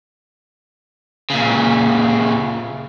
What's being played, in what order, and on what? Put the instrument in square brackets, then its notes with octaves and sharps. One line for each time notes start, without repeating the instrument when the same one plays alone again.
[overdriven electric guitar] A#2 C#3